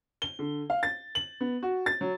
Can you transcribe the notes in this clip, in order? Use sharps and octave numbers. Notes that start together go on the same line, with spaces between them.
G7
D3
F5
A6
F#7
B3
F#4
A6
F#3